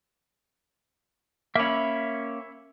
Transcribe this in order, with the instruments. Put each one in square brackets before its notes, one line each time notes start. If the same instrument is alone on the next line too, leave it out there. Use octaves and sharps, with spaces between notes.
[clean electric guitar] A#3 C#4 [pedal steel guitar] E5 B5